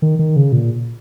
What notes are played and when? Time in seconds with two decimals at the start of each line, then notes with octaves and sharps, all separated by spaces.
0.02 D#3
0.19 D#3
0.36 C#3
0.52 A#2